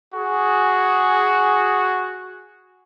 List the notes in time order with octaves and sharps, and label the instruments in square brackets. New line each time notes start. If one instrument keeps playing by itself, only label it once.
[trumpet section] F#4 G#4